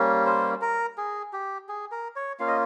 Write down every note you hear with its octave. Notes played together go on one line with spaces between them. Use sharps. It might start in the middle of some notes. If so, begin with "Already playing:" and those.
Already playing: G3 A#3 C#4
C5
A#4
G#4
G4
G#4
A#4
C#5
A#3 C#4 F4 F5
D#5